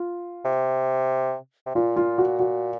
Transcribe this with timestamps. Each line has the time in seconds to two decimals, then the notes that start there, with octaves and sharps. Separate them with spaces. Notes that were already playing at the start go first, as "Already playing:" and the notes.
Already playing: F4
0.45 C3
1.66 C3
1.75 A#2 F4
1.96 F4
2.18 F#4
2.40 F#4